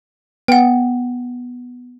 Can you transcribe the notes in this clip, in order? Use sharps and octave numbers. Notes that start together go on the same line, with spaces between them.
B3 F#5 G5